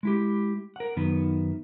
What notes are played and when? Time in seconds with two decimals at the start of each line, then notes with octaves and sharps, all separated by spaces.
0.03 G#3 E4 G4
0.76 A#4 F#5
0.97 F#2 D#3 B3